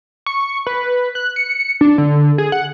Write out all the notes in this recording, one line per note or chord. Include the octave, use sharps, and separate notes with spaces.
C#6
B4
F#6
C#7
D4
D3
G#4
F#5